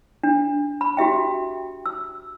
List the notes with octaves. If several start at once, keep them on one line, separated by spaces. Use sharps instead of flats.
D4
B5
F#4 G4 E5 G5
E6